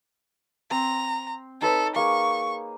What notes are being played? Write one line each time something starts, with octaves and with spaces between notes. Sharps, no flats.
C4 A#5
D#4 A4 B4 C#5
A#3 G#4 C#6